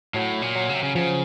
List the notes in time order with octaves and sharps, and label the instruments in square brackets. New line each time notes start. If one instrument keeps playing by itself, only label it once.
[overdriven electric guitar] A2 [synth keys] F#3
[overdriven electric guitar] A#2
[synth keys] F#3
[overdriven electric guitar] C#3
C3
C#3
[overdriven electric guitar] C#3 [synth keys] F3